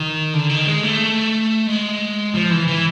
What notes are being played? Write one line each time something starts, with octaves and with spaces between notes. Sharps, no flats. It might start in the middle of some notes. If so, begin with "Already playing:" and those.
Already playing: D#3
D3
D#3
G#3
A3
G#3
F3
E3
E3